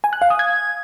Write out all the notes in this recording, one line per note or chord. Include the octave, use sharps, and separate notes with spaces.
G#5
F#6
F5
D#6
G#6